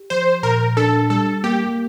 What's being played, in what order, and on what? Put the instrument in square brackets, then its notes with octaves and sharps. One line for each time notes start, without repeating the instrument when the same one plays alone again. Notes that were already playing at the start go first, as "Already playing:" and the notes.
Already playing: [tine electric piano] G4
[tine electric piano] F3 [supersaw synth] C5
[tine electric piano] A#2 [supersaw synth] A#4
[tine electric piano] D4 [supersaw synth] A4
[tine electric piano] G3 [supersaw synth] A4
[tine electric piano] A#3 [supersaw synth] G4